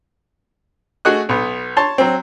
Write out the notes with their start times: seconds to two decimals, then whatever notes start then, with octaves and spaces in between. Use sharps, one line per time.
1.05 A3 F#4 G#4 D#5 F#6
1.29 B1 B3
1.77 C#5 A5 C6
1.98 F#3 C4